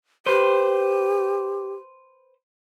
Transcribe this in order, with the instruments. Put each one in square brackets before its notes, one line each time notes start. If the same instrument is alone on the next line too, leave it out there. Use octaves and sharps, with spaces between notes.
[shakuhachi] G4 [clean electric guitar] B4 C5